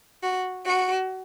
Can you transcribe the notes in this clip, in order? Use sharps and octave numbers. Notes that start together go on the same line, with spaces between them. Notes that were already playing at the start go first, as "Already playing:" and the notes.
F#4
F#4